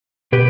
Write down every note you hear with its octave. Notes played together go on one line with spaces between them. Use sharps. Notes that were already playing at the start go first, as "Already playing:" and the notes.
B2 G4 B4